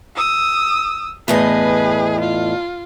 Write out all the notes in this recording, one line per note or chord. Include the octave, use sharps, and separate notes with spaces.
D#6 E6
E2 A2 G#4 B4 D#5
F4